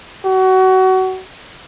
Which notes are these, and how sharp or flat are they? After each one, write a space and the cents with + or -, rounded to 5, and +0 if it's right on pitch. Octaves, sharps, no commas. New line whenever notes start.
F#4 +25